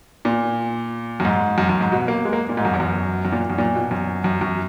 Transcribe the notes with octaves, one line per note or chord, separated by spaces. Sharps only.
A#2
F#2
G#2
F#2
F#2
G#2
B2
A#3
G#3
A#3
A#2
G#2
F#2
E2
F#2
F#2
A#2
F#2
A#2
B2
F#2
F#2
F#2